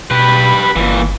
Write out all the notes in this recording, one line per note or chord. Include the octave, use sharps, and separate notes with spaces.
B2 G4 B4 B5
G1 A#2 E3